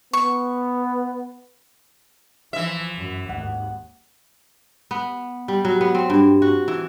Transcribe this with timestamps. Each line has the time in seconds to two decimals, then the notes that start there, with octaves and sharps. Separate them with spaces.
0.13 B3 C#6
2.53 E3 F3 E5
2.96 F#2
3.29 G#1 D#2 F#5
4.91 B3
5.48 G3
5.65 F#3
5.81 B3
5.95 C4
6.10 G2
6.42 F#4
6.68 E3